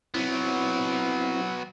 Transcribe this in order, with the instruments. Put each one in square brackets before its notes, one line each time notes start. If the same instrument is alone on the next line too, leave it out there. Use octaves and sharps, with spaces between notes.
[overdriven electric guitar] F#3 B3 [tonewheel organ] C4 E4